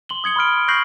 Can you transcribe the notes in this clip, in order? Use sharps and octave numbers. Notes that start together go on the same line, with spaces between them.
C6 F#7 G7
D#6 G#6 C#7 G7
B5 C6 F6 D7
C#6 F#6 G6 A#6 C7 F#7